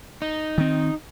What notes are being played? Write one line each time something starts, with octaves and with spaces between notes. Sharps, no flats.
D#4
D#3 C4